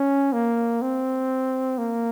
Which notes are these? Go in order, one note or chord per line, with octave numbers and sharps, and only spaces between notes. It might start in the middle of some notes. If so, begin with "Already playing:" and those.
Already playing: C#4
A#3
C4
A#3